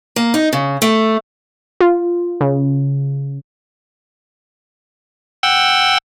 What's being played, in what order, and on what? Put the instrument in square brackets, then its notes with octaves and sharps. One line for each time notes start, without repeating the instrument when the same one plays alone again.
[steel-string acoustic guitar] A#3
D#4
C#3
A3
[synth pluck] F4
C#3
[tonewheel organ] F#5 G5 E6